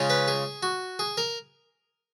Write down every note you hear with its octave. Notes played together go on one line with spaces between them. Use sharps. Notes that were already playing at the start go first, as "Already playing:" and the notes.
Already playing: C#3 G#3 C#4 F4
B4
G#4
F#4
G#4
A#4